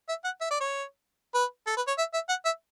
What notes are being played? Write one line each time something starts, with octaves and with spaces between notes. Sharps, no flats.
E5
F#5
E5
D5
C#5
B4
A4
B4
C#5
E5
E5
F#5
E5